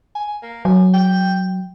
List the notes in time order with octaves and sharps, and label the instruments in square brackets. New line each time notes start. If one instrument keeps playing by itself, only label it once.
[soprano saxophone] G#5
A#3
[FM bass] F#3 [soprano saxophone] G#5
[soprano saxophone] G5